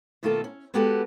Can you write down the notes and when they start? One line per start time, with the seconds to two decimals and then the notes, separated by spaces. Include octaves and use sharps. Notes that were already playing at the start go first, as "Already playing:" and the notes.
0.23 B2 D#3 A3 A#3 F4 A4
0.44 C#4
0.74 G#3 B3 F#4 G4 A4 B4